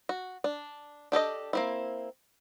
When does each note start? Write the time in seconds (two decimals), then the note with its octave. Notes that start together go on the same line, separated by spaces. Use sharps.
0.09 F#4
0.44 D4
1.12 D4 G4 A4 D#5
1.53 A#3 C4 E4